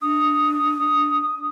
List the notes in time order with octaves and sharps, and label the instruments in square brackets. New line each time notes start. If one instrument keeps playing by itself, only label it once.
[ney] D4 [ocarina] D#6